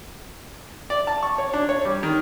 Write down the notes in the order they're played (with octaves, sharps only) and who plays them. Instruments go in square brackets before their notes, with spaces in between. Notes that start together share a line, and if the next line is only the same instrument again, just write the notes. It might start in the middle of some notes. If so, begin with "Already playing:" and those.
[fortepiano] D5
A5
C#6
C#5
D4
C#5
G3
D#3